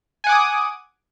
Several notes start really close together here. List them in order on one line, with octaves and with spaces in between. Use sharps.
G#5 F#5 D6 D#6